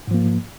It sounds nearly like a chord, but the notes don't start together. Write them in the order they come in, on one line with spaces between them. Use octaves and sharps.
G#2 F3 A#3